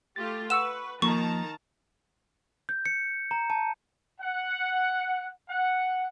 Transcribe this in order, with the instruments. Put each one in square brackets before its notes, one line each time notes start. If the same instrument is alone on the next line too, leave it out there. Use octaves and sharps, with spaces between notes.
[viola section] A3 F4 G4 [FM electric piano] A6
[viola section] B4 [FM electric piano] F#5 C#6 [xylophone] E6 E7
[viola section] D#3 A5 A#5 [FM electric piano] F3 A#3 [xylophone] C#6
[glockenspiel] G6
C#7
A#5
A5
[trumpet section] F#5
F#5